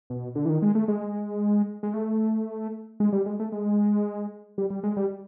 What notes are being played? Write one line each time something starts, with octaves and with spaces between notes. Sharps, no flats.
B2
D3
E3
D#3
G#3
A3
G#3
G#3
A3
G#3
G3
G#3
A3
G#3
G3
G3
G#3
G3